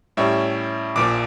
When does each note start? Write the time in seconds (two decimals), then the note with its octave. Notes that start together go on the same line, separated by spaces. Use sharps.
0.17 A2 G3 C#4 E5
0.96 A#1 A#2 F3 D6